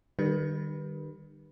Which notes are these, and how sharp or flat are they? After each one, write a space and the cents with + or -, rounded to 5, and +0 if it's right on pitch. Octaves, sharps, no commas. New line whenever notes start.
D#3 -40 G3 +0 B4 -10